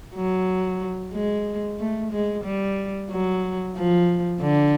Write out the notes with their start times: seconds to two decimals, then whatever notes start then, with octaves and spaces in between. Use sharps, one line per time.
0.15 F#3
1.13 G#3
1.79 A3
2.12 G#3
2.44 G3
3.10 F#3
3.76 F3
4.41 D3